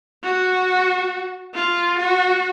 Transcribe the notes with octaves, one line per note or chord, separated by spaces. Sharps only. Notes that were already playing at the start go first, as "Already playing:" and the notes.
F#4
F4
F#4